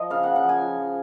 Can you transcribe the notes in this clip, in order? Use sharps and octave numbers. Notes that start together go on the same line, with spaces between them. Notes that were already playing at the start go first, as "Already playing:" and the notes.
Already playing: F3 D#5
C#3 F5
C#3 F#5
F#5
F3
G#5
F3
F3